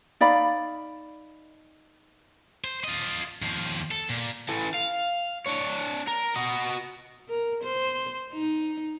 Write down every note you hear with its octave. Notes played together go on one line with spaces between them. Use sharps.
D#4 D5 F5 B5
C5
F4 D#5
D#2 F3
A4
A#2
E3 A4
F5
D4 C#5
A#4
F#4 D#5
A#4
C5
D#4